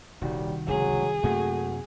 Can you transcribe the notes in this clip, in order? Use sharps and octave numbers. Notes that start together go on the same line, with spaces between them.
D#1 C2 D#3 G3 F#4
F1 C#2 F#3 G#4
F#2 C3 A3 A#3 F#4